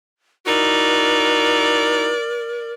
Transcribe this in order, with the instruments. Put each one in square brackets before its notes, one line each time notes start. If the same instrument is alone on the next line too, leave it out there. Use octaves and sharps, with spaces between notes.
[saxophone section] D#4 E4 F#4 [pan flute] A#4 [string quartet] D5